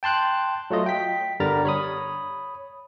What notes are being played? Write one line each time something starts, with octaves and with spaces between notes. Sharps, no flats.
G5 A5 C6 F#6 G6
F#3 A3 F4 D#5
G5 B6
G1 D3 G3 A#4 A#5 A6
C#5 B5 D#6